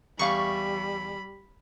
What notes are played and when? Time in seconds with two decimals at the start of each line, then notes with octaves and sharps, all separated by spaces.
0.19 E2 G3 F5 B5 C#6